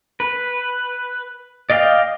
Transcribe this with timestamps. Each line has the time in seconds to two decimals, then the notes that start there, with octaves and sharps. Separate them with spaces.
0.20 B4
1.70 D5 D#5 F5 G5